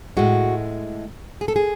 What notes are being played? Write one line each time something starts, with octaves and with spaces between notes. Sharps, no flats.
A2 G#3 F#4
G#4
A4
G#4